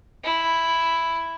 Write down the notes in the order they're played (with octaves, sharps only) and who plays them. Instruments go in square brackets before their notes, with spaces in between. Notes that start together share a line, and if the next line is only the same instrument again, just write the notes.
[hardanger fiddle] E4